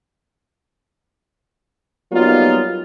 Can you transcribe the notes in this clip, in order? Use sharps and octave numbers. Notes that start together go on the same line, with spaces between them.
F#3 G3 A#3 B3 D#4 F4